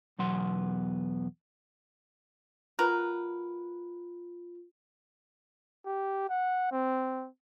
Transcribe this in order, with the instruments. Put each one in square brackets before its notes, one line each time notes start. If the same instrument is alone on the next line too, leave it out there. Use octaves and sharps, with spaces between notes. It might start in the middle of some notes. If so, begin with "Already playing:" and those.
[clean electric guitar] E2 B2 F#3 B3 F#5 C6
[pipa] F#3 A#4 B4 [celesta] F4
[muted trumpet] G4
F#5
C4